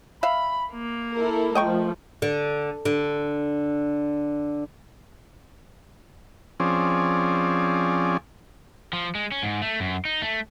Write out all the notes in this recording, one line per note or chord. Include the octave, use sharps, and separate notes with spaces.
E5 F5 B5
A#3
E4 A4 A#4
F3 A3 D#5 G5 C#6
D3
D3
F3 C4 C#4 G#4 D5
F3
G#3
C#4
G#2
A3
F#2
D#4
A3